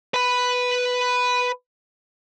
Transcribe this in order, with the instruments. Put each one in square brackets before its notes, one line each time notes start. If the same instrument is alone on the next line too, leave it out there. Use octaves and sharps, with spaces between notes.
[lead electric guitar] B4 B5